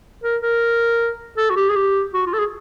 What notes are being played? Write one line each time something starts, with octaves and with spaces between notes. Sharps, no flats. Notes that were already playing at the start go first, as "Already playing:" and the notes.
A#4
A#4
A4
F#4
G4
G#4
G4
F#4
F4
A4
G#4